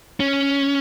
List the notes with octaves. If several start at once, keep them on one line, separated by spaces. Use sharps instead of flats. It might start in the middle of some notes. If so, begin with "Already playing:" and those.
C#4